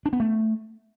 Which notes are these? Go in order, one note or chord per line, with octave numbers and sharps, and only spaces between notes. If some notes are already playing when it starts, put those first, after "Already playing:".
D4
B3
A3